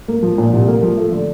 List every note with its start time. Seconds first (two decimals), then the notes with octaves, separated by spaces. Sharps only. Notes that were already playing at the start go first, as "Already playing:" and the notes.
0.08 A#3
0.23 F3
0.38 A#2
0.53 C2
0.68 A#3
0.83 F3
0.97 A3
1.12 D3